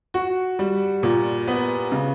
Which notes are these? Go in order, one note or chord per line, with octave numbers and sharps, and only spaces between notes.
F#4
G3
A#2
B3
C#3